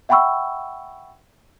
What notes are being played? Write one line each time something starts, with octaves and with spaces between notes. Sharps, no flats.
E5 F#5 G5 B5 C#6 E6